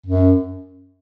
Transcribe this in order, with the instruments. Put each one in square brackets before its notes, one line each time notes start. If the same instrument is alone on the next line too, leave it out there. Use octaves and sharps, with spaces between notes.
[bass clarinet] F#2